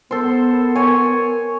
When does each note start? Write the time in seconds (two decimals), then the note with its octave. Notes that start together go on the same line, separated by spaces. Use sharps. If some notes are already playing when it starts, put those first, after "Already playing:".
0.11 B3 A4 A#4 C5
0.75 C#5 G#5